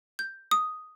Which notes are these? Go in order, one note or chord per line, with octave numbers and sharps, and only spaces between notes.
G6
D#6